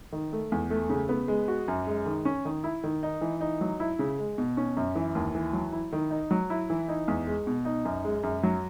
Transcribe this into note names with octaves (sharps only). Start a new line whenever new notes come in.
D#3
A3
E2
A3
C#3
B3
G#3
F#4
F#2
G#3
D#3
C#4
D#3
E4
D#3
D#4
E3
D#4
F#3
E4
C#3
G#3
B2
C#4
F#2
E3
D#2
E3
F#3
E4
D#3
D#4
F#3
E4
E3
D#4
E2
G#3
B2
D#4
F#2
G#3
F#2
F#3